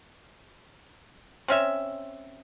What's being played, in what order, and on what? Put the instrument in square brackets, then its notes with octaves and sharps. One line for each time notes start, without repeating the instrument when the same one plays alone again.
[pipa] C4 C#4 E5